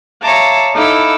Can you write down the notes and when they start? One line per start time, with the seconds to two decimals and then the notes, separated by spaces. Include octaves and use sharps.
0.22 C#5 E5 F5 A5 A#5 D6
0.73 D#4 E4 A4 F5 D6 E6